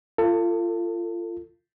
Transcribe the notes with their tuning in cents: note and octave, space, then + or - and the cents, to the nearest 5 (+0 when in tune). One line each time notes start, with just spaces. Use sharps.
F4 -25 A4 +30